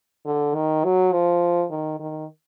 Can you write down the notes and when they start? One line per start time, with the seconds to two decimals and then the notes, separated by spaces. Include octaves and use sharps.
0.26 D3
0.54 D#3
0.84 F#3
1.12 F3
1.70 D#3
1.99 D#3